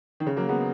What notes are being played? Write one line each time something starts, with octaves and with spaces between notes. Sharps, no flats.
D#3
C#3
F#3 A#3
G#3 B3